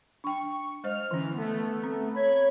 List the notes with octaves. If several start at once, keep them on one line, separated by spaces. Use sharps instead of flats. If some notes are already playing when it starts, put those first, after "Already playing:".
D4 G5 C#6
G#3 C5 D#5 F6
D3 E3 C#4
A3 B3
C4
C#5 B5 G#6